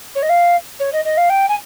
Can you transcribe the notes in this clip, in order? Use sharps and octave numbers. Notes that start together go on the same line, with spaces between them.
C#5
D#5
F5
C#5
D#5
D#5
F5
G5
G#5